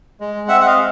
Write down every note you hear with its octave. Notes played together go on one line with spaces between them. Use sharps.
G#3
C4 E5 F#5
F#5
D#5 F5
G#3